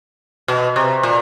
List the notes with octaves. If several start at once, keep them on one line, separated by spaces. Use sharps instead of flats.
B2
C3
A#2